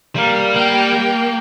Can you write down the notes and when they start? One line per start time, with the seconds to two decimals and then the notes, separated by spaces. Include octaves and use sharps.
0.16 G3 A#3
0.56 A#3 G5